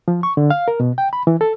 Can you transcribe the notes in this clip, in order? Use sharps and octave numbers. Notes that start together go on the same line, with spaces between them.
F3
C#6
D3
F5
A#4
B2
G5
B5
E3
A4